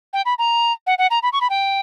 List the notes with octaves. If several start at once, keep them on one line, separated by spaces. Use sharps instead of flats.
G5
B5
A#5
F#5
F#5
A#5
B5
C#6
B5
G5